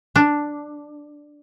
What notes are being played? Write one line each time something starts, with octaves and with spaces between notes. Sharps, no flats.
D4